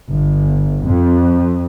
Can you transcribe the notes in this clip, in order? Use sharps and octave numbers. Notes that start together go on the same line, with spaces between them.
G1
F2